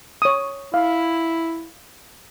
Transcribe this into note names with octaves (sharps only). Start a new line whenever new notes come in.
C#5 D#6
E4 F5